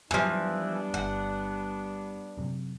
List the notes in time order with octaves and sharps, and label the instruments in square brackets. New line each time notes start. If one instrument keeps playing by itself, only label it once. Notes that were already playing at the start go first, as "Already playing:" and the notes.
[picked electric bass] F#2 [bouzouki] E3 F3 [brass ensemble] G3 B3 D4
[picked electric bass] G1 [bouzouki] F#5
[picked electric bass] F#2 C3